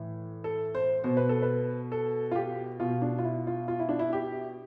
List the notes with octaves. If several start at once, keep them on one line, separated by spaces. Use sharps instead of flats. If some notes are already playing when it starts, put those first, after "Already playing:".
Already playing: A2 E3
A4
C5
B2 C5
B4
A4
B4
A4
F4
G4
B2 F4
D4
F4
E4
F4
F4
E4
D4
E4
G4